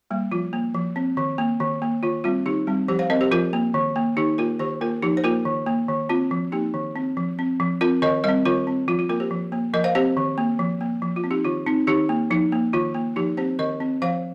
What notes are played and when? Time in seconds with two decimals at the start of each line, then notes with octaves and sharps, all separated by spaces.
0.11 G3 A#3
0.32 F3 F4
0.53 A#3
0.74 F3
0.96 C4
1.17 D#3
1.38 A#3
1.60 D#3
1.82 A#3
2.03 D#3 F4
2.24 G3 C4 F4
2.46 D#3 D#4 G4
2.67 G3 C4
2.88 F3 G4 C5
2.99 C5 F5
3.10 C4 A#4 D#5
3.21 G4 C5
3.31 F3 F4 A#4
3.53 A#3
3.74 D#3
3.96 A#3
4.17 D#3 D#4 G4
4.38 A#3 F4 A#4
4.59 D#3 G4 C5
4.81 A#3 F4 A#4
5.03 F3 D#4 G4
5.17 C5
5.24 A#3 F4 A#4
5.45 D#3
5.67 A#3
5.88 D#3
6.09 C4 F4
6.31 F3
6.52 A#3 D#4 G4
6.74 D#3
6.96 C4
7.17 F3
7.39 C4
7.60 F3
7.81 C4 F4 A#4
8.02 D#3 A#4 D#5
8.24 G3 C4 A#4 D#5
8.45 D#3 F4 A#4
8.67 C4
8.88 F3 F4
8.99 F4
9.09 A#3 F4 A#4
9.20 G4 C5
9.31 F3
9.52 A#3
9.74 F3 A#4 D#5
9.84 C5 F5
9.95 C4 G4 C5
10.17 D#3
10.38 A#3
10.59 F3
10.81 A#3
11.02 F3
11.16 F4
11.24 C4
11.31 D#4 G4
11.44 D#3 F4
11.66 C4 D#4
11.87 D#3 D#4 G4
12.09 A#3
12.31 F3 D#4
12.52 A#3
12.73 D#3 F4
12.94 A#3
13.16 F3 D#4 G4
13.37 C4 G4 C5
13.59 D#3 A#4 D#5
13.80 C4
14.02 F3 C5 F5